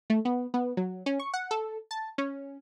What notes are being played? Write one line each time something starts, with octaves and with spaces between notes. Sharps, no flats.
A3
B3
B3
F#3
C#4
C#6
F#5
A4
A5
C#4